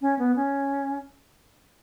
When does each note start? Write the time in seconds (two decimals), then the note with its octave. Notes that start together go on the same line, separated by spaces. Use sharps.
0.01 C#4
0.19 B3
0.36 C#4